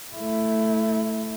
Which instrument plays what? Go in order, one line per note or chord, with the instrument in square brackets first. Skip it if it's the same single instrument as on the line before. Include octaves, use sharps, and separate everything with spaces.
[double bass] A3 E4